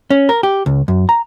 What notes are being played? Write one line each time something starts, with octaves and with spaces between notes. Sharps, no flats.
C#4
A#4
G4
C#2
F#2
A#5